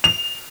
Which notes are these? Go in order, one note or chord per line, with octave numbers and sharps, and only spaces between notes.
F7